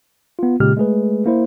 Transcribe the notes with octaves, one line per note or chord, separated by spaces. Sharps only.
B3 F4
A#2 C#3 G#3 G4 F6
G#3 A3 G#4 B4
A#3 E4 C5